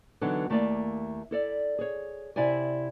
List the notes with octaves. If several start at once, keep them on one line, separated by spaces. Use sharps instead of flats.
D3 E3 F#3 B3 D#4 A4
D#2 A3 A#3 E4 D5 F5
E4 A4 D5
G#4 C#5
C3 E4 D5 E5 G#5